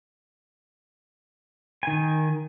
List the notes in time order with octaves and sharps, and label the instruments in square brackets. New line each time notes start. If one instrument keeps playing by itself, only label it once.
[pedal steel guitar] D#3 G#5